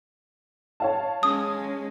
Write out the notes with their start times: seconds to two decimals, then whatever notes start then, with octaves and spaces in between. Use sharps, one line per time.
0.80 C#5 F5 A5
1.23 G#3 C#4 D#6